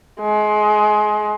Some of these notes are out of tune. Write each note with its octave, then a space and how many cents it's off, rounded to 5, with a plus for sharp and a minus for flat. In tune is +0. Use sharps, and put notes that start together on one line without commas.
G#3 +25